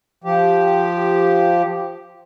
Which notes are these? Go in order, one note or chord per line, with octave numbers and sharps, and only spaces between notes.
F3 G4